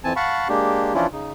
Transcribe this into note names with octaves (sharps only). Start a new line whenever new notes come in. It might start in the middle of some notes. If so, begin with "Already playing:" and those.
F2 E3 C4 G#5 A5
F5 F#5 A5 B5 C#6
G#3 A#3 D4 G4
E3 F3 C#4 D4 E4 F4
C#3 D#4